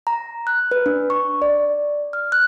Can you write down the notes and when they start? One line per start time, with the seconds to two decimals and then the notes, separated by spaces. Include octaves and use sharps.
0.07 A#5
0.47 F#6
0.71 B4
0.86 D4
1.10 C#6
1.42 D5
2.13 F6
2.32 F#6